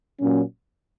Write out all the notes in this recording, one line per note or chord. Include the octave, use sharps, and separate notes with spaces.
A#2 F#3 C#4